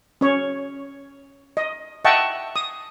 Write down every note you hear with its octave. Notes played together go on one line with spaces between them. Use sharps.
C#4 C#5
D#5
D#5 E5 F#5 G5 A5 C#6
D#6